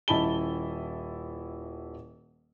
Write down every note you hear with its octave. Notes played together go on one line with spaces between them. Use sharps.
D#1 E4 D#5 A5 B5 G7